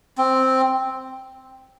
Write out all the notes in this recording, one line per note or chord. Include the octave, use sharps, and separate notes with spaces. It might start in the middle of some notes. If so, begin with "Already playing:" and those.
C4